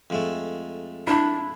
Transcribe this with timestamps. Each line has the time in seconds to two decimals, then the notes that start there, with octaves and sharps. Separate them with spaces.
0.10 F2 G#3 A3
1.07 D4 E4 B5